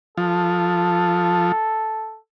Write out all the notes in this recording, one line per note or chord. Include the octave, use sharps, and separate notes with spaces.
F3 A4